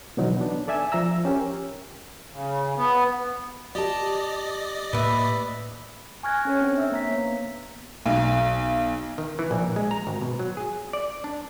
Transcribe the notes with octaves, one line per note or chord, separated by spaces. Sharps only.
B2 D3 E3 F#3 D#4
B3 D4
A4 D5 E5 G#5 E6
F3 E5 A#5 E6
C#4 G4 A#4
C#3
B3
G4 D5 D#5 A5
A2 A#3 B4 E5
G#5 C#6 F6 F#6 G#6 A#6
C#4 A4 C#5
C4 D4 C#5
E5 E6
A#3 A#5 B6
B3
B1
D#3
E3
A#1
G#3
A#5
G#1
B2
F#3
G#4
D5
D4